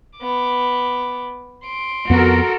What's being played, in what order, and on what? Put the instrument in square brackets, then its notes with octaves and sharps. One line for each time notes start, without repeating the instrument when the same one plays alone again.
[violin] B3 D6
C6 D7
[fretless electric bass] F2 B3 [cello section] F#4 A4 A#4